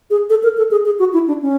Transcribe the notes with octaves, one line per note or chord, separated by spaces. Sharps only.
G#4
A4
A#4
A4
G#4
G#4
F#4
E4
D4
C#4